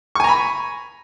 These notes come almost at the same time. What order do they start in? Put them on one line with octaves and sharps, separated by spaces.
C#6 G#5 A#5 B5